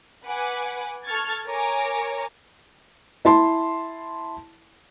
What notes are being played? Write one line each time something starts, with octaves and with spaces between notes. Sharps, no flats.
B4 F#5 G#5 D6
A4 C#6 F6 G#6 A6
A#4 C#5 G#5 A#5 D6
E4 A5 C6